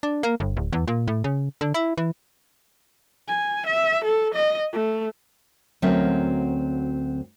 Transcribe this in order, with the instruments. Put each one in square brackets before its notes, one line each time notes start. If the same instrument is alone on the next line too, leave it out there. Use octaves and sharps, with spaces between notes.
[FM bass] D4
A#3
G1
D1
E2
A#2
A2
C#3
D3
E4
E3
[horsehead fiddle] G#5
E5
A4
D#5
A3
[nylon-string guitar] D2 F#3 C4 C#4 A#4 E5